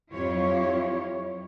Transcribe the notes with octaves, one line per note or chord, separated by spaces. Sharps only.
F2 F#3 E4 F4 G4 C#5